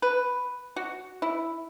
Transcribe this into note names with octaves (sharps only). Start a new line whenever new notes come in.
B4
F#4
E4